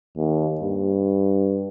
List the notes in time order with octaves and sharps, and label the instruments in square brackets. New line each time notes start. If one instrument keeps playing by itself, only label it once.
[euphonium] D#2
G2